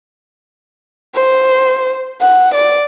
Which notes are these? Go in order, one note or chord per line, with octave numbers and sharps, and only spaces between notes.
C5
F#5
D5